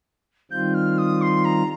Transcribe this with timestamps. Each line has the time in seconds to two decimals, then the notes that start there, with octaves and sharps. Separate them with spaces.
0.51 D#3 G3 C4 F4 G6
0.74 F6
0.98 D#6
1.22 C6
1.45 A#5